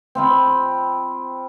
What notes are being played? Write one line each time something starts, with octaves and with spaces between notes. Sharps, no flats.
C4 F4 B5